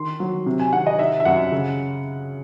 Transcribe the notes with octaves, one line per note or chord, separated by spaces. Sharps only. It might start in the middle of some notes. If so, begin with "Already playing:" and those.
Already playing: D#3 C6
F#3
C3
G#5
D#3 F#5
D#5
D#4 E5
E5
F#2 F#5
C#3